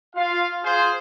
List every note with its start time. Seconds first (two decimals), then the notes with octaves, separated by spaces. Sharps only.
0.15 F4 F5
0.63 F4 G#4 C5